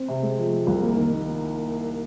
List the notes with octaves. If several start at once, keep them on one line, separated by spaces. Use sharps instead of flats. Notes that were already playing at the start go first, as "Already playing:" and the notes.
Already playing: C4
C3
G#3
F3
G#3
C2
A#3
D#3
A#3